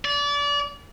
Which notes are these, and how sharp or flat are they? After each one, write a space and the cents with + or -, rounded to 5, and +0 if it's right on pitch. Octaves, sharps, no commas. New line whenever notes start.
D5 -30